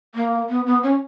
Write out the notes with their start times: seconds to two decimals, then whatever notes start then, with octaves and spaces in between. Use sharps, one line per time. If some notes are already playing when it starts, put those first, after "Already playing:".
0.15 A#3
0.49 B3
0.67 B3
0.83 C#4